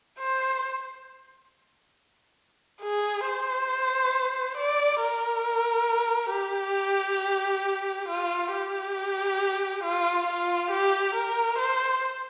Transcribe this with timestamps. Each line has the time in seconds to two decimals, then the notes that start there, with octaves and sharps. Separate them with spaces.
0.19 C5
2.82 G#4
3.26 C5
4.57 D5
5.01 A#4
6.33 G4
8.08 F4
8.52 G4
9.83 F4
10.27 F4
10.71 G4
11.15 A#4
11.58 C5